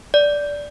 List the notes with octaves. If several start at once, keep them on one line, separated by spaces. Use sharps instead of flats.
D5